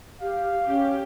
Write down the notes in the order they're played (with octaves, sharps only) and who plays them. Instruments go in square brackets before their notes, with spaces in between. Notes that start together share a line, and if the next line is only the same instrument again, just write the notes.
[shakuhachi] G4 [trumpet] F5
[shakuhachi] C#4 [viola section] G4